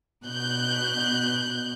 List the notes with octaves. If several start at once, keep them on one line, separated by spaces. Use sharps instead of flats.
B2 F#6 G6